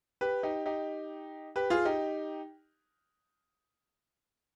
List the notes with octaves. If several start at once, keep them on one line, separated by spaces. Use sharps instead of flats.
G4 B4
D#4 G4
D#4 G4
G4 B4
F4 G#4
D#4 G4